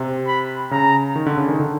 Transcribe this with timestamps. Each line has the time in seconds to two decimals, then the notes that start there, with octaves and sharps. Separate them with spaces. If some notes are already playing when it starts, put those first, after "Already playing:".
Already playing: C3
0.27 B5
0.71 C#3 A#5
1.16 D#3
1.26 D3
1.37 C#3
1.49 D#3
1.60 D3